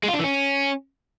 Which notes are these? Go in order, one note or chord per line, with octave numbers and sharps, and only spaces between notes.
G#3
F4
D4
E3
C#4